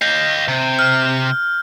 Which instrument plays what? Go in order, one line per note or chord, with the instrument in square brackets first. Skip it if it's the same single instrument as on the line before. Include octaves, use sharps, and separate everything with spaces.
[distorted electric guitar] D#5 F5 [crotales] G6
[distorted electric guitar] C3
[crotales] F6